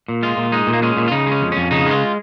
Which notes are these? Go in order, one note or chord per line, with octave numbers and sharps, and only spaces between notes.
A#2
G#3 F4
A#2
G#3 D#4
A#2
A#3
G#3 C#4
A#2
F4
C#3 D#4
G#3
C#4
F2
F2 C#4
C#3 D#4
G#3 F4